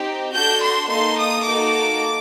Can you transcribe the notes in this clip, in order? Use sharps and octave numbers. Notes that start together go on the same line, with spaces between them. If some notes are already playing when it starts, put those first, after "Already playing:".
Already playing: C4 D#4 G4
D4 F#4 A4 G6
C6
A#3 D#4 A4 C6
D#6
A#3 D#4 F#4 A4 D6